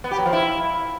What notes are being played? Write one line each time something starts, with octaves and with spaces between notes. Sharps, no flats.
B3
G4
F#3
F3
E4